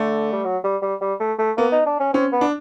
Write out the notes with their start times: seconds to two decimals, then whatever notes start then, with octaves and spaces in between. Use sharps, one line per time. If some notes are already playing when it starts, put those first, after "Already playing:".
Already playing: D3 A3
0.33 G3
0.45 F#3
0.64 G3
0.82 G3
1.01 G3
1.20 A3
1.39 A3
1.57 A#3 B3
1.72 D#4
1.86 D4
2.00 C#4
2.13 C4 C#4
2.32 B3
2.41 D4